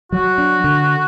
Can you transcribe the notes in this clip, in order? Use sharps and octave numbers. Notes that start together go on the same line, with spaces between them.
F#3 F#4
D4
D3